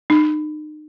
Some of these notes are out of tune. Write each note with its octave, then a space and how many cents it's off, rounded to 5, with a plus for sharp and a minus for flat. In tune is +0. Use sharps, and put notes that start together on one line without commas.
D#4 -35